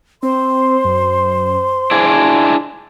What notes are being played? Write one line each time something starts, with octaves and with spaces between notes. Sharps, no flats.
C4 C5 C6
F#2
D4 E4 G#4 G#6